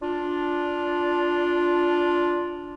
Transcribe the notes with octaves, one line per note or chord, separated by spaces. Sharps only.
D4 F4